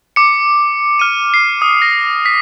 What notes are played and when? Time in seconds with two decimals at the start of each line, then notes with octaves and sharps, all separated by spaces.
0.16 D6 C#7
0.99 F6 D#7
1.34 C7
1.62 D#6
1.82 A#6
2.26 B6